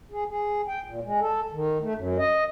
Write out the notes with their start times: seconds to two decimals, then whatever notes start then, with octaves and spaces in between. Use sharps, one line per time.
0.12 G#4
0.30 G#4
0.68 G5
0.84 A#2
1.04 G#3
1.21 A4
1.52 D#3
1.82 A3
1.95 F#2
2.18 D#5